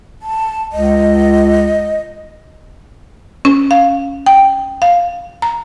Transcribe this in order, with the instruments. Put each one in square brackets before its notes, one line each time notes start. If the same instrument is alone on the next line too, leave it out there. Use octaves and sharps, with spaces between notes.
[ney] A5
[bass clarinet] C#2 [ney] D#5
[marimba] C#4
F5
G5
F5
A#5